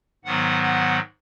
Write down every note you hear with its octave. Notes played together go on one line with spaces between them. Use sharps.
G#2 D#3 F#3 B3 F#5
F#5